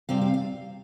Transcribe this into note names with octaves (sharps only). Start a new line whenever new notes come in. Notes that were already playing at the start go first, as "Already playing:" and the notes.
C3 G3 C4 F5
F5
F5